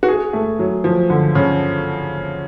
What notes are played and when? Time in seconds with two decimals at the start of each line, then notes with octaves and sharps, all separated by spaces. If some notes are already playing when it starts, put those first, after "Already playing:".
0.03 F#4
0.08 G#4
0.33 A3
0.59 F#3
0.84 F3
1.10 D3
1.35 C#3